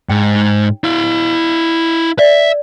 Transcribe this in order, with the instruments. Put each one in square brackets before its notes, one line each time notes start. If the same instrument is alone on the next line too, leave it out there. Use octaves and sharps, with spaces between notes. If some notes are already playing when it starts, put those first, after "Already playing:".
[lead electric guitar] G#2 [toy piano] G5
[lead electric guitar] E4 F5
[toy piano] D5 [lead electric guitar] E5